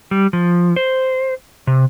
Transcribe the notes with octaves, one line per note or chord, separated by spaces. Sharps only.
G3
F3
C5
C3